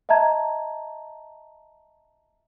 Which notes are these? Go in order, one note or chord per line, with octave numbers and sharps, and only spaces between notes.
D#5 E5 A5 A#5 G#6